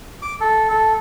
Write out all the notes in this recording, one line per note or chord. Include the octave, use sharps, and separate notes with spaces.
D6
A4
A4